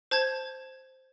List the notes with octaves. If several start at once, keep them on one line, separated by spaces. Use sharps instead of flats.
C5 A5 G6 G#6